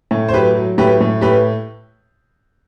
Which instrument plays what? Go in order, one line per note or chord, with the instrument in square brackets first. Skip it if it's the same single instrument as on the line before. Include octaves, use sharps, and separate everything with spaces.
[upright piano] A2
C5
F#3 G4 B4
F#3
A2 G4 B4
A2
A2 G4 B4